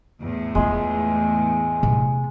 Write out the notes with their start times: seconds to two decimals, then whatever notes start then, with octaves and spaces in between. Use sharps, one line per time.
0.21 E2 A2
0.55 E3 G#3 F4
1.83 C3